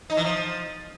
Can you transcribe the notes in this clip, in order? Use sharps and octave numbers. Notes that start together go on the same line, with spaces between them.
D#4
E3
F3